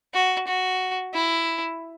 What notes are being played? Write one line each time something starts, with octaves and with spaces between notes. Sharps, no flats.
F#4
F#4
E4